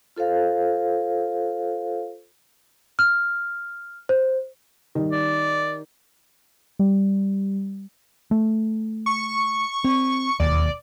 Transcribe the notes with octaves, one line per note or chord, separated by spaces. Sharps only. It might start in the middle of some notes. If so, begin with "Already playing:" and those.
F4 A4 C5 F5
F6
C5
D#3 G3
D5
G3
A3
C#6
C4
E1 D#2 D5